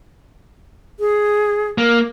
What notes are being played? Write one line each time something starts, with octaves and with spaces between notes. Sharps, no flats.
G#4
A#3